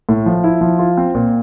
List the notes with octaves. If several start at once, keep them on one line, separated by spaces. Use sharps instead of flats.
A2
F3
E4
F3
F4
C4
A#2